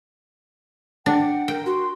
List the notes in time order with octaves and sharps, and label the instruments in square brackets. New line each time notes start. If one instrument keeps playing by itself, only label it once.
[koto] D4 [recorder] F#5 [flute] G5
[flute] A#4 [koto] G5
[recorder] F#4 [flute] C6